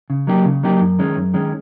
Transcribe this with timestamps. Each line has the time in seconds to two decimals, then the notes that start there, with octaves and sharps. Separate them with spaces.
0.10 C#3
0.27 F#3 A#3 D#4 G4
0.45 C#3
0.63 F#3 A#3 D#4 G4
0.81 F#2
0.99 D#3 G#3 C#4
1.16 F#2
1.34 D#3 G#3 C#4